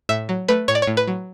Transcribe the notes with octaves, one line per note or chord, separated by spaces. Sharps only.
A2 E5
F#3
A3 B4
A2 C#5
D5
C#5
A2
B4
F#3